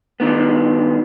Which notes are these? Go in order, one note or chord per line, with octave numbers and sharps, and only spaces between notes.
G2 D#3 B3